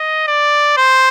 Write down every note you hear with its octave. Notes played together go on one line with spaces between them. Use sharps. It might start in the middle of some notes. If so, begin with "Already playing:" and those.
Already playing: D#5
D5
C5